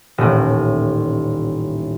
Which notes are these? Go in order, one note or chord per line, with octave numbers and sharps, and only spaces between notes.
D#1 A1